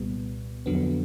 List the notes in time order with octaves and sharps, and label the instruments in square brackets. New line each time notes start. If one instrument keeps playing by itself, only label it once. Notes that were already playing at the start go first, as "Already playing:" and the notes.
Already playing: [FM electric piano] C2 A#2 G3 B3
F2 D3 F#3 B3